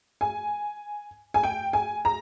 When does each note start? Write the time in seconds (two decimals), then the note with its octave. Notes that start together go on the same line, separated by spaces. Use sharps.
0.21 G#5
1.34 G#5
1.43 G5
1.73 G#5
2.05 A#5